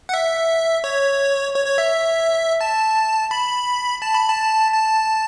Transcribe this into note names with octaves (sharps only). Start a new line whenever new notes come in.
F#5
E5
C#5
C#5
C#5
E5
A5
B5
A5
B5
A5
A5